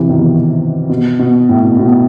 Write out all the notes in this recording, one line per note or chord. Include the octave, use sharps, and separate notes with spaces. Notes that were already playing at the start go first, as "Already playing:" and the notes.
Already playing: C3 E3
B2 D#3
B2
B2
A2
B2
B2